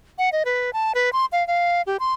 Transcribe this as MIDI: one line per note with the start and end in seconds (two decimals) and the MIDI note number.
0.18 0.30 78
0.32 0.43 75
0.45 0.73 71
0.73 0.93 81
0.95 1.12 71
1.13 1.25 84
1.32 1.46 77
1.48 1.82 77
1.87 1.97 67
2.00 2.13 84